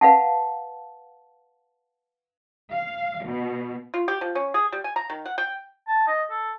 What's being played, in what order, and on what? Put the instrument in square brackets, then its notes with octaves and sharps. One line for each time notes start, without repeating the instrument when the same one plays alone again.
[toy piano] B4 F5 F#5 A5
[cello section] F5
B2
[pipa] F4
G4
F3
C#4
G#4
G3
G#5
A#5
D#3
F#5
G5
[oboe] A5
D#5
A4